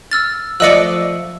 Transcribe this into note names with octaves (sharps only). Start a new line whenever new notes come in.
E6 F6 A6
F3 A3 D5 D#5 D6 E6 F#6 C#7